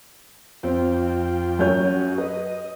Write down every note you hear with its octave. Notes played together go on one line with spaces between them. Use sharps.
F2 C4 F4 G5
F#2 C#5 G6
C#4 F#4
B4 D#5